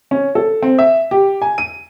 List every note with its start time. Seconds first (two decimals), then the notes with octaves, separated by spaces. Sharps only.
0.11 C#4
0.35 A4
0.62 C4
0.78 E5
1.11 G4
1.42 G#5
1.58 D#7